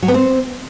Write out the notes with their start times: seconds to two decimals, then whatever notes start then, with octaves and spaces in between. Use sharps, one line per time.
0.02 F#3
0.08 B3
0.14 C4